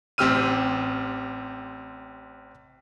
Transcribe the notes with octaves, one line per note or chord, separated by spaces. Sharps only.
A1 C4 G4 E6 F6 D#7